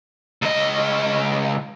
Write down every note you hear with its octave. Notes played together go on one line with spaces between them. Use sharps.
C#2 D#5